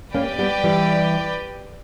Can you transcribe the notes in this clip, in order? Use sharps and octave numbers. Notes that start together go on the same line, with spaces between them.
A#3 C#4 G4 B4 D5 G5
G3 B3
E3 G3